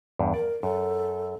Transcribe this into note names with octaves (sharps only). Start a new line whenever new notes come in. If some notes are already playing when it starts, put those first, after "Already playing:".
E2 G2
A#4 D5
F#2 A4